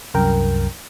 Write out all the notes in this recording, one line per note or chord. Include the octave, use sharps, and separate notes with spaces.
C2 F#2 A#4 G5